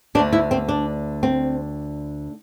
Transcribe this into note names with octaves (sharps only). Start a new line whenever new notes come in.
D2 D3 D4
E4
C4
D4
C4